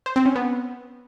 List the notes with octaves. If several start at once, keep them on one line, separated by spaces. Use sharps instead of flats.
C5
C4
C#4
B3